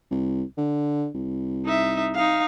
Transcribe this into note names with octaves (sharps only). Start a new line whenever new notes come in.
C2
D3
C2
D#4 E5
D#4 F5